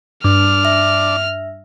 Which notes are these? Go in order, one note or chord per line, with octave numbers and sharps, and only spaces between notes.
G2 D4 F6
E5